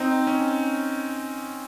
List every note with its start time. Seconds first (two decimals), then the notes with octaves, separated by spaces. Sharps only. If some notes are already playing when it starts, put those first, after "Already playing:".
Already playing: C4 D#4
0.27 C#4